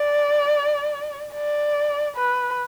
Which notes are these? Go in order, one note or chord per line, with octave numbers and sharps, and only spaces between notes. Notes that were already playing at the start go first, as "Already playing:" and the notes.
Already playing: D5
D5
B4